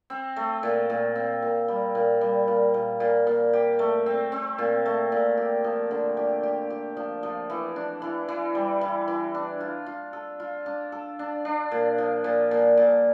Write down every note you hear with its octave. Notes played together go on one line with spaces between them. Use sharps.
C4
A3
A#2
A#2
C4
A#2
G3
A#2
G3
A#2
A#2
A#2
A#2
G4
A3
C4
C4
A#2
A3
A#2
G4
F3
D3
G4
G4
G4
F3
F3
E3
D4
E3
E3
G3
E3
E3
D4
F4
F4
A4
F4
D4
A4
D4
D4
A#2
F3
A#2
A#2
A#2